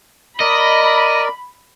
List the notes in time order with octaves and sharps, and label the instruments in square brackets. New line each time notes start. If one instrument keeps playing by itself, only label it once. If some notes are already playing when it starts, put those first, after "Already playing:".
[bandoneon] A#4 D5 [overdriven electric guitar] D#5 [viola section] B5